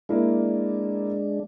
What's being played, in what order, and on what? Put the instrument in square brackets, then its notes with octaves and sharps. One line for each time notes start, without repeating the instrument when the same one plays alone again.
[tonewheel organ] G#3 D4 [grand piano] A#3 E4